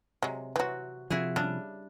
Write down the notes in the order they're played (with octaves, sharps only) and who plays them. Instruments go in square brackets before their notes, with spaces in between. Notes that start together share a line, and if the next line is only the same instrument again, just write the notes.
[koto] C3 [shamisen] F#3 G#3
[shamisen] E3 F#3 [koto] C4 F#4
[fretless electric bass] C3 F3 [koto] E4 F#4 G#4
[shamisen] C#3 [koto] G3 D4